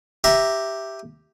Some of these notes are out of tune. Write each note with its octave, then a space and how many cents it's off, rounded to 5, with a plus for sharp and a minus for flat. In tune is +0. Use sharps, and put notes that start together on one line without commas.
G4 +0 E5 +0 A#5 +0